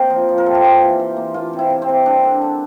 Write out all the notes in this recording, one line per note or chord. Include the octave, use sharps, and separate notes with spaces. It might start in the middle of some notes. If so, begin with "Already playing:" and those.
Already playing: C3 A#3 A#4 C5
F3
F3
A#4
C3 A4
G4
A#3 F4
E3
E3
A#3
A#3 F4
C3
E4
C3
C4
C3
G3 D4
D3
D3